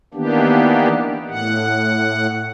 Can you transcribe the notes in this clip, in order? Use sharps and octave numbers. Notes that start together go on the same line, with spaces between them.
D#3 E3 A#3 B3 D4 G4
A2 F#5